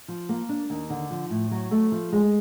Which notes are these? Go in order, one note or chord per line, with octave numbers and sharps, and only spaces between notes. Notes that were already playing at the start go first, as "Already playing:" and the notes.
F3
A#3
D4
D#2
D3
F3
A2
F#3
A3
F3
G#3